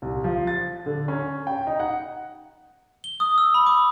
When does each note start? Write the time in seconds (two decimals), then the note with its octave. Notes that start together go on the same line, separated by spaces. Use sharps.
0.02 C2
0.24 F3
0.47 A6
0.86 D3
1.08 C#4
1.47 G5
1.67 D#4
1.79 F#5
3.04 G7
3.20 D#6
3.38 E6
3.54 B5
3.67 D6